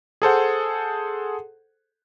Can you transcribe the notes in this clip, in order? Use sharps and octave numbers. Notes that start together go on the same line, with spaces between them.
G#4 A4 C5 F#5